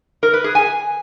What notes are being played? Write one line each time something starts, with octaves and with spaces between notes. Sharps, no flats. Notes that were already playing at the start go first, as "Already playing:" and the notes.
A#4
B4
G#4
G#5